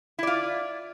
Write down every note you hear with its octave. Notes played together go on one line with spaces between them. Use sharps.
E4 F4 D5